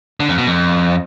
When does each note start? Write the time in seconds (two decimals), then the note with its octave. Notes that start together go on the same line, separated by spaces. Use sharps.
0.20 D3
0.29 F2
0.38 B2
0.47 F2